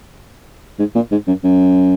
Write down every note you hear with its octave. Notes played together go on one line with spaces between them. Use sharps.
G#2
A#2
G#2
F#2
F#2